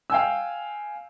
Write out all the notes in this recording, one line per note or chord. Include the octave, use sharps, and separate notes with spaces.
F5 G5 G#5 E6